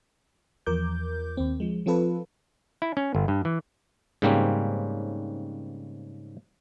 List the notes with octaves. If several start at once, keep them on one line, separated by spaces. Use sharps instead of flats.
E2 F3 A#4 D6 G6
D#2 C4
F3 G#3
F3 C4 F4 A4 B4
E4
C#4
G1
G2
E3
G#2 C#3 G3 A#3 C4 C#4